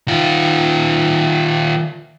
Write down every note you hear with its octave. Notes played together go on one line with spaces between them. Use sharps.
D#3 F4